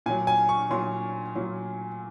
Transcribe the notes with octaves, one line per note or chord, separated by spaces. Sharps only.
A#2 F#3 G#5
G#5
C#6
A#2 F#3 C6
A#2 F#3